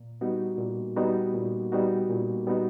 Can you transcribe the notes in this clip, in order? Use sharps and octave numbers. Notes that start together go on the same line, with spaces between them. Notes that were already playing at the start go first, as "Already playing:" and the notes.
Already playing: A#2
G3 B3 D#4 F#4
A#2
G3 B3 D#4 F#4
A#2
G3 B3 D#4 F#4
A#2
G3 B3 D#4 F#4